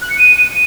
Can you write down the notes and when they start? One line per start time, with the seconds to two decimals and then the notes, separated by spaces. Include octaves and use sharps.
0.01 F#6
0.10 C#7
0.18 D#7